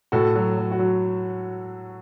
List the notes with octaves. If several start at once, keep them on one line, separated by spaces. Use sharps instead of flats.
A2 F#4 A4
F#3
F#3
F#4
F#3